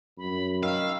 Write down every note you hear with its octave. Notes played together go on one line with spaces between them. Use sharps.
F#2 B5
D#3 F5 E6